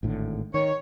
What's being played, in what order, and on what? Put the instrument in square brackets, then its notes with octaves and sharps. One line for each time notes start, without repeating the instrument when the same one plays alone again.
[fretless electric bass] G#1 A2 D3
[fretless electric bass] D#3 [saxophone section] C#5